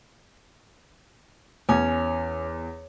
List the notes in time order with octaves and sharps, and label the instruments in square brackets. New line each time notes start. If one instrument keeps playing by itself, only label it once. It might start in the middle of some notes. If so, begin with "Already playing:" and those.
[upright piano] E2 [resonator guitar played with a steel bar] C#4